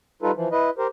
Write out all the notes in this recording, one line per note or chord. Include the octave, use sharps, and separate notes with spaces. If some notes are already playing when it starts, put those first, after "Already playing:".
G3 D#4 F4 A4 B4
E3 F3
E4 B4 D#5
G4 A#4 C5